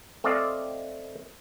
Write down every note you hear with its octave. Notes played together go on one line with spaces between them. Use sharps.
A3 C4 A4 D5 D#5 F5